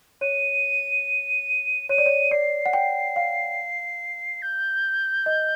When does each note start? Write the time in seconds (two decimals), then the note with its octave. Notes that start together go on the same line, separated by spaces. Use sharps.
0.21 C#5 D#7
1.89 C#5 D#7
1.98 D5
2.06 C#5
2.31 D5 C7
2.66 F#5
2.73 G5
3.16 F5
4.42 G6
5.26 D#5